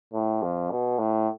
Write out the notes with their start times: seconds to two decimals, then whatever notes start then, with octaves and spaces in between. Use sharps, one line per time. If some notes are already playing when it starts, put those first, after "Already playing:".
0.13 A2
0.42 F2
0.71 B2
0.98 A2